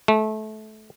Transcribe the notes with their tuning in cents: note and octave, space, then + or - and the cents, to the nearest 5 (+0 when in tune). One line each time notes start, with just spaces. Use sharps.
A3 -25